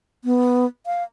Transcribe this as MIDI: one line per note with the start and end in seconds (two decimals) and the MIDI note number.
0.24 0.66 59
0.86 1.03 77